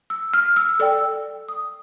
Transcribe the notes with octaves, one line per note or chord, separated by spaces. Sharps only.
E6
F6
E6
A4 D5 G5 E6
D#6